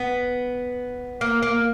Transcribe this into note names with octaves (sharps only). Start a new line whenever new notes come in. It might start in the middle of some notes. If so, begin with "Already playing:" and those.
Already playing: B3
A#3
A#3